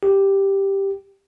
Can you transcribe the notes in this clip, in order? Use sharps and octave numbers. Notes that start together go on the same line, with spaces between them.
G4